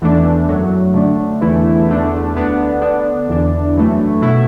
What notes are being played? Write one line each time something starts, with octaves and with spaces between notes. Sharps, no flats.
E2 E3 A3 D4
F#2 F#3 A3
D3 A3 D4
E2 E3 A3 E4
E2 D3 A3 D4
D2 D3 B3 D4
D3 B3 D4
E2 E3 D4
F#2 E3 A3
B2 A3 E4